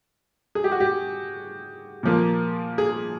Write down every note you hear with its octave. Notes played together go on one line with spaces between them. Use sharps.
G#4
G4
F#4
G4
A#2 F3 A#3
G#4